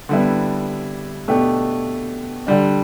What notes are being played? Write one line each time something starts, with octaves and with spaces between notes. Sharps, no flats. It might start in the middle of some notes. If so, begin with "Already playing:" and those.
D3 G3 B3 E4
B2 A3 D4 G4
D3 G3 D4